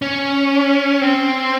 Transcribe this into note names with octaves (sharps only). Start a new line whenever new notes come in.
C#4
C4